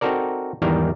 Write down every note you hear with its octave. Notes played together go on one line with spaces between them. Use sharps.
C4 D#4 F#4 A4 A#4 D5
E2 G#2 D#3 E3 G3 A#4